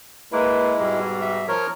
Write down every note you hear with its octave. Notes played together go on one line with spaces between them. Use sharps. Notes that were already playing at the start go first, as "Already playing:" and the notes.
G#3 A#3 E4 B4
G#2 B2 G3
E5
F3 A#4 C#5